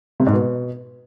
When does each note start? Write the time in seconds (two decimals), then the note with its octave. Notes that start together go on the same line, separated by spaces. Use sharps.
0.20 C3
0.26 G#2
0.33 B2